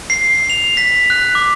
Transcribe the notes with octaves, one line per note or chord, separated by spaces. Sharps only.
C7
F7
B6
F#6
D6